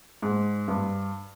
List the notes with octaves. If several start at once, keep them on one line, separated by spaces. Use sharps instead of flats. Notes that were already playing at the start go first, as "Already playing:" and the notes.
G#2
G2